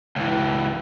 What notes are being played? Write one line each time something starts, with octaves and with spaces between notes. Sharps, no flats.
C#2 E3